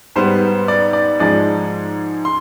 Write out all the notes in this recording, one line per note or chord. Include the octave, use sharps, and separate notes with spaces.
G#2 G3 B3 C5
D5
D5
G#2 F3 G#3 D5
C6